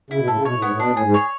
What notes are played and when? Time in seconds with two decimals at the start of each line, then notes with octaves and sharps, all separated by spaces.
0.10 C#3 E4
0.19 B2
0.28 A2 A4
0.36 C#3
0.45 B2 C#5
0.54 A2
0.62 G#2 B3
0.71 A2
0.79 B2 D4
0.91 A2
0.97 G#4
1.03 G#2
1.14 C#5